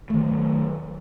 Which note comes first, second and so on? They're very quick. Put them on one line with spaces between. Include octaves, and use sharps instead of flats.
A3 D#3 F#3